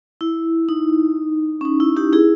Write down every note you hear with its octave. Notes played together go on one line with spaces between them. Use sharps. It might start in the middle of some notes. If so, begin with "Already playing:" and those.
E4
D#4
C#4
D#4
E4
D#4 G4
E4 G#4